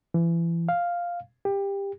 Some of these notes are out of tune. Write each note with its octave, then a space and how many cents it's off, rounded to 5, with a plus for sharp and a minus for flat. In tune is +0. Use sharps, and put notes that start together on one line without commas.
E3 +30
F5 +0
G4 +20